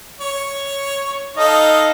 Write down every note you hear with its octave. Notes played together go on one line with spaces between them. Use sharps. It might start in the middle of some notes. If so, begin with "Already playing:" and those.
C#5
D#4 A4 D#5 F5